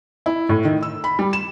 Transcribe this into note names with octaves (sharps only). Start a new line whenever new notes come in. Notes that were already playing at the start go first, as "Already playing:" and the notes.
E4
A2
D#3
E6
B5
G3
E7